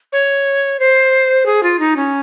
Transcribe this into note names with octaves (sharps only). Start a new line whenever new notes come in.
C#5
C5
G#4
F4
D#4
C#4